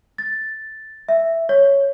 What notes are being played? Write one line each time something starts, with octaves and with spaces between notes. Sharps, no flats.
A6
E5
C#5